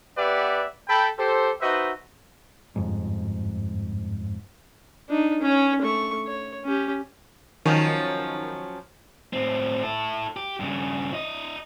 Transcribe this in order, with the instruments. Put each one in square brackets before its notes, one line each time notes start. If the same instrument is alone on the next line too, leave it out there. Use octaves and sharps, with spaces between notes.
[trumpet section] B3 G4 B4 D5 E5 F#5
A4 G5 B5
G4 A4 C5
D#4 F#4 B4 C5 D#5 E5
[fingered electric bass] G1 F2 G#2
[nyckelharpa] D4 D#4
C#4 C#5
A3 C#6
C#5
C#4 G4
[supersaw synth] D#3 [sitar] F3 F#3 C#4
[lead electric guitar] A2 C4
E4 A4
G4
G2 C#3
E4 D#5